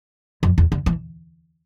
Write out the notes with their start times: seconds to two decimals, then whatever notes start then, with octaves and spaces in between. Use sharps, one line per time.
0.43 F2
0.58 E2
0.72 D3
0.86 E3